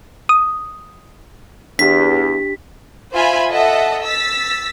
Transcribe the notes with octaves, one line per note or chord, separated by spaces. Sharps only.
D#6
E2 D4 G4 B6
F4 C5 E5 G#5 B5
A4 D#5 E5 F#5 A5
E6 A6 B6